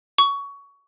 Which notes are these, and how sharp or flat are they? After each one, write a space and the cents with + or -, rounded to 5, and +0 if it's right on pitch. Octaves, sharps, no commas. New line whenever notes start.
C#6 +20